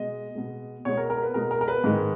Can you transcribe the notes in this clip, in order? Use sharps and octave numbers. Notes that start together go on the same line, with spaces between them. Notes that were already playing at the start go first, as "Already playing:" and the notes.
Already playing: B2 G#3 D#5
B2 G#3
B2 G#3 C#5
A#4
A#4
B4
B2 G#3 A#4
A#4
A#4
B4
G#2 D#3 G#3